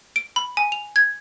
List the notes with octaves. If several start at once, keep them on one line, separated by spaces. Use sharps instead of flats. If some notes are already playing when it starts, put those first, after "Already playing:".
D7
B5
G#5
F7
G#6